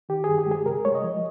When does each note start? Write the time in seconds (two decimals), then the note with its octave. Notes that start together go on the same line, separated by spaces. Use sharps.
0.09 D#3 G4
0.24 G2 G#4
0.38 G4
0.47 G#3 G#4
0.66 C3 A#4
0.85 G#3 C#5
0.95 D#5
1.04 F3